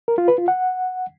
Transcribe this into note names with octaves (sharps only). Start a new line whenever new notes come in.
A#4
F4
B4
F4
F#5